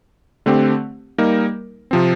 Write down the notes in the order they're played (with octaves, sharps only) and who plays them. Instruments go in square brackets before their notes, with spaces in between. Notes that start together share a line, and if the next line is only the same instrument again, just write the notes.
[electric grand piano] D3 A3 C4 G4
G3 A#3 D#4 A#4
C3 F3 C4